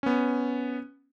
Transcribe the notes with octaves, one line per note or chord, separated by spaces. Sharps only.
B3 C#4